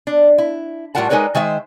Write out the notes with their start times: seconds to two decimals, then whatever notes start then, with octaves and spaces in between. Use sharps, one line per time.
0.07 D4
0.38 E4
0.95 A2 G3 F4 A#4 F#5 A5
1.10 G#3 D#4 A#4 B4 C#5 D5
1.35 D#3 G#3 C5 E5